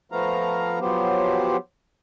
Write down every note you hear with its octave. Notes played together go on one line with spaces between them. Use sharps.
F3 A3 B3 F5 A#5
F3 F#3 B3 G4 C5